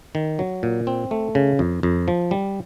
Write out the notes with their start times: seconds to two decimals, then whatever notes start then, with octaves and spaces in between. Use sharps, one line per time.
0.15 D#3
0.39 F#3
0.63 A#2
0.87 C4
1.11 A3
1.35 C#3
1.59 F2
1.83 F2
2.08 F3
2.31 G3